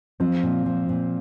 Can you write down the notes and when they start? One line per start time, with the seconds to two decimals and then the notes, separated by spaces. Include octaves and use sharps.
0.20 F3 C4
0.43 A#2
0.66 F3
0.89 A#2